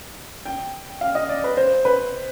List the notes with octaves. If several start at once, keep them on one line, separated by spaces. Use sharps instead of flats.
G5
F5
D#5
D5
B4
C5
B4